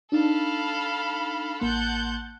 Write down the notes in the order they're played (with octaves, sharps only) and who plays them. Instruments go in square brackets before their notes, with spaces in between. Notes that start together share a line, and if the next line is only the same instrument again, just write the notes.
[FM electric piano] D4 D#4 A5 [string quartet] A4 F5 B5
[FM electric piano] A1 A#3 C6 [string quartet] F#5 A5 G6